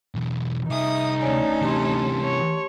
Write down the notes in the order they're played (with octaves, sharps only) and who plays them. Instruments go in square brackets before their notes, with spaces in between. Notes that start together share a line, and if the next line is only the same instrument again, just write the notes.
[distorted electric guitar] B1 E2
[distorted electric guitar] C2 G#4 [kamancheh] D#4 [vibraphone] E5 [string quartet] D#6
[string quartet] D2 C#4 A4 [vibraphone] C#5 D5 G#5
[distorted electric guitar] C3 E3 [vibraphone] G4 A5 C6
[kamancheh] C#5